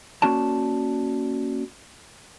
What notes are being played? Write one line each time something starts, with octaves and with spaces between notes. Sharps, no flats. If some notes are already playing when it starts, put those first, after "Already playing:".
A#3 C#4 F#4 D5 A5